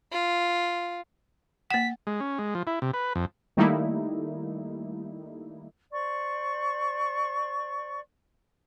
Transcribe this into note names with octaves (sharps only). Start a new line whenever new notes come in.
F4
A#3 F#5 B6
G#3
C#4
G#3
F3
E4
C3
B4
F2
D#3 G3 A3 A#3 D#4 E4
C5 D5 C#6